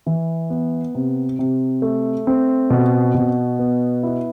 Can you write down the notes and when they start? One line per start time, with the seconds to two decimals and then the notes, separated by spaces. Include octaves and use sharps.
0.06 E3
0.50 B3
0.95 C3
1.39 C3
1.82 A3
2.27 C4
2.70 B2
3.15 B2
3.59 B3
4.03 E4